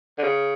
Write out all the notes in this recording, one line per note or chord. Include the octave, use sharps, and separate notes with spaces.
D3
C#3